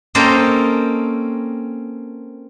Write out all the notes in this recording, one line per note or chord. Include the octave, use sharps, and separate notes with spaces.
A#3 C4 C#4 A4 C5 D#5